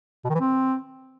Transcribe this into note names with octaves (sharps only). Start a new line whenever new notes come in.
B2
D#3
E3
C4